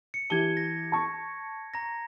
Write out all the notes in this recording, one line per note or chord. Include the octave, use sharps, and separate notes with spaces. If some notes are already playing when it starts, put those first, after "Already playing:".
C#7
E3 G4 A5 G#6 G7
A#6
A5 C#6
A#5 A#6